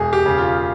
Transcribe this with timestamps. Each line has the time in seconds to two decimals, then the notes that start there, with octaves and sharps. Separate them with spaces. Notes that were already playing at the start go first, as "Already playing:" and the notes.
Already playing: E1 G#4
0.13 G4
0.26 C#3
0.38 F4